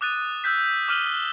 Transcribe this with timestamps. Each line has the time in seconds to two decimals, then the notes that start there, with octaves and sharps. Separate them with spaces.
0.01 D6 D#6 F#6 A6 D#7
0.44 E6 F#6 G6 B6
0.88 D6 F6 D#7 F#7 G7